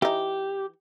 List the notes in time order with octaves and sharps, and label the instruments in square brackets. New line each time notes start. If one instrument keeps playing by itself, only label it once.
[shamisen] E3 D#4 [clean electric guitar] G4